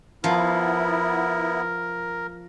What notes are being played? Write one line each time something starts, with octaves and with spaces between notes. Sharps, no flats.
F3 B3 E4 A#4